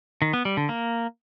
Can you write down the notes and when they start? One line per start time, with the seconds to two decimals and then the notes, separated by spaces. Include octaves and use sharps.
0.22 D#3
0.33 B3
0.45 G3
0.57 D3
0.69 A#3